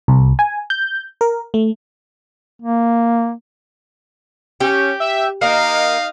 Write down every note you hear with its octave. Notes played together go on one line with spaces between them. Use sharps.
C2
G#5
G6
A#4
A3
A#3
C#4 G4
E5
A#3 D#4 D#5 F5